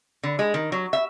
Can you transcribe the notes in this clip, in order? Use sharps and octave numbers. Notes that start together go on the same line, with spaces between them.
D3
G#3
D#3
F#3
E5